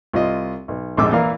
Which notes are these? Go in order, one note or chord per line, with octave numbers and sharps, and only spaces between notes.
C2 F4 D#5
B1
A#1 F2 G#2 D6 E6
A#2 E3 A#3 E4 A#4 F5